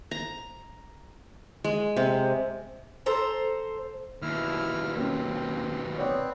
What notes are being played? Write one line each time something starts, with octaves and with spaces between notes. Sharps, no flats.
A#5
G#3
C3
A4 C5 A#5
D#2 B2 E4 E6 F6
A#3 C4 C#4
B3 C4 C#5 D5